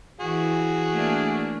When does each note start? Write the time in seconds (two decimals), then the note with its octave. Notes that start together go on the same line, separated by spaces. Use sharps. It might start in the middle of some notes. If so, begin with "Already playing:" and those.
0.20 E3 F#4 G#4
0.93 A3 A#3 D4